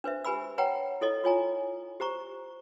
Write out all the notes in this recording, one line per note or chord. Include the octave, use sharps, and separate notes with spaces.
D4 B4 C5 E5
G4 B4 G#5 B5 E6
B4 C#5 F#5 G5 A#5
E4 A4 C#5 D#5
F4 C#5 G#5 A#5
G4 C5 A#5 C#6